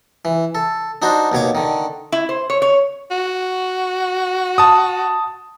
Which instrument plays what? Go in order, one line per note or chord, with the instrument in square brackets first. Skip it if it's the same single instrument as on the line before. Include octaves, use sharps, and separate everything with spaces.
[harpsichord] E3
A4
D4 D#4 F#4 C5
D#2 B2 C#5 D6
D3 D#3
[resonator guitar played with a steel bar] E4
C5
C#5
C#5
[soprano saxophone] F#4
[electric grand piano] A5 D#6